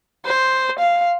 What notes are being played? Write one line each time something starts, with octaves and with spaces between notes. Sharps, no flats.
C5
F5